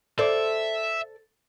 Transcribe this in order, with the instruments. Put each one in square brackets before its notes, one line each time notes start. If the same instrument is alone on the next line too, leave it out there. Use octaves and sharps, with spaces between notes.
[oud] A4 C5 D5 [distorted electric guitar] E5